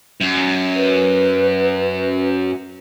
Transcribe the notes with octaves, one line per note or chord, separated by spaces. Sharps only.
F#2
B4